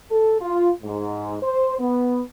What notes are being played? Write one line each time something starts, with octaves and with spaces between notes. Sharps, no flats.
A4
F4
G#2
C5
B3